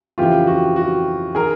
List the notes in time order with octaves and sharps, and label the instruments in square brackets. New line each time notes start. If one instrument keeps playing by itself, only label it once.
[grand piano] F2 C#3 E3 F4 G4
F#4
F#4
D#3 G#4 A#4